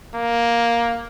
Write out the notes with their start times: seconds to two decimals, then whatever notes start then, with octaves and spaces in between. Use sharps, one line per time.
0.14 A#3